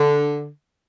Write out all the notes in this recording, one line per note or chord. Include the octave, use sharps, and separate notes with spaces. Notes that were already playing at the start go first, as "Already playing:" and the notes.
Already playing: D3